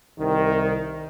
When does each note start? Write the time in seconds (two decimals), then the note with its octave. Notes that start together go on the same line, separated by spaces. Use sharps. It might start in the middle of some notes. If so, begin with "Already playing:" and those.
0.19 C2 D#3